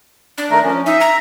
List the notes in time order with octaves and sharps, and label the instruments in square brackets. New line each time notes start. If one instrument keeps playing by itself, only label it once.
[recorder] D4
[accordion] D#3 A3 A#4
F3 C#4
[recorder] D#4 [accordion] E5
[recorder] A#5